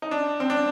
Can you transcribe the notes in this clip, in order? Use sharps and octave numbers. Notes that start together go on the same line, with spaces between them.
D#4
D4
C4
D4